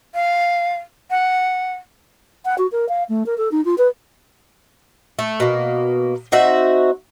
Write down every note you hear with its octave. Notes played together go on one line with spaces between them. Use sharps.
F5
F#5
F#5
F#4
A#4
F5
A3
A#4
A4
D#4
F4
B4
A3
B2 A#3
C4 D#4 F#4 E5